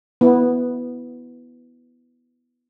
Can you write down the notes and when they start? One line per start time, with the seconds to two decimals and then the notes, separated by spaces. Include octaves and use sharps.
0.21 B3 E4